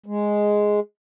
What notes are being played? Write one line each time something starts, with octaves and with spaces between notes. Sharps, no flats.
G#3